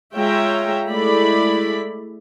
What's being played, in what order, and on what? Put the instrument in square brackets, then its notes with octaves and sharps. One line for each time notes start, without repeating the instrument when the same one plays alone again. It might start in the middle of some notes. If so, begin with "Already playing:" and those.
[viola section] G#3 F4 C#5 E5 G5 A#5
G#3 A3 E4 D5 B5